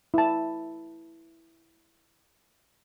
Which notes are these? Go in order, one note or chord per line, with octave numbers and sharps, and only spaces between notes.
E4 A5